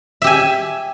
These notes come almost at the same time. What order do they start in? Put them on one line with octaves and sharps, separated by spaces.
E5 G4 G#5